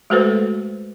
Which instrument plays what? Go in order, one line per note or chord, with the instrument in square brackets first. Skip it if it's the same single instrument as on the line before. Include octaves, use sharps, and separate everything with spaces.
[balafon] G#3 A3 F#4 A4 B4 C5